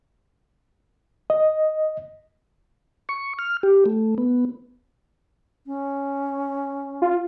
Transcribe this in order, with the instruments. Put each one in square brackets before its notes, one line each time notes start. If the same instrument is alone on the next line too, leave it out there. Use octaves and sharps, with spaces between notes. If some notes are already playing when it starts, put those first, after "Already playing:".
[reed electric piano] D#5
[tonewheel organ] C#6
F6
G4
A3
B3
[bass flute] C#4
[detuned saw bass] F4